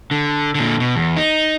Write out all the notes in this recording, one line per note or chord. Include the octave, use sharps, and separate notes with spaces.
D3
A#2 D3
B2
E2
D#4